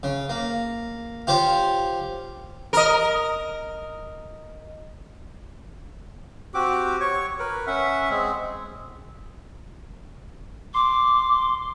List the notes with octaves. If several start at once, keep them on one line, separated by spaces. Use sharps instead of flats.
C#3
A#3
F4 G4 C5 C#5
A#4 D#5
C4 F#4 G4 D6
C#5 C#6
A#4 B4
C#4 E5 F#5
G#3 C4
C6 D6